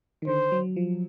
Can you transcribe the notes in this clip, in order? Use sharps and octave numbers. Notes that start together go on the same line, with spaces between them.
D#3
D3 C5
F#3
F3